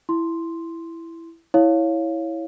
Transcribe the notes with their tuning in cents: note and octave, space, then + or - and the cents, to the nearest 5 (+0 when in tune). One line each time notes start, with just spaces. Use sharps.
E4 +5 C6 +0
E4 -10 C#5 +0 F5 +0